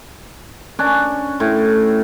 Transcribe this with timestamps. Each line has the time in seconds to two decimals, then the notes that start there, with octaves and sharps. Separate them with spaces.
0.79 C#4 D4
1.40 A2